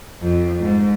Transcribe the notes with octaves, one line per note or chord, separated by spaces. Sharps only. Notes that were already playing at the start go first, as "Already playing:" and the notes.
F2
G#2